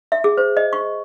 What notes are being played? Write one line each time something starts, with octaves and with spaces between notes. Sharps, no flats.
E5
G#4
C5
D#5
C#6